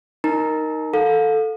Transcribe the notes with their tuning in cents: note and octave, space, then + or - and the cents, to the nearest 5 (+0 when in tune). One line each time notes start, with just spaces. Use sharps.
D#4 +0 A#4 +0 A#5 +0
A4 +0 F5 +40